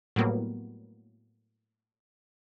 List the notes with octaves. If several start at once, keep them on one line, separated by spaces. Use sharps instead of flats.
A2 F#3 G3 A#3 B3